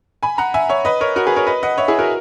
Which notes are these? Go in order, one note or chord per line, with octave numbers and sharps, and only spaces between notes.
G#5 B5
F#5 A#5
E5 G#5
C#5 E5
B4 D#5
A#4 C#5
F#4 A#4
G#4 B4
A#4 C#5
B4 D#5
D#5 F#5
C#5 E5
E4 G#4
F#4 A#4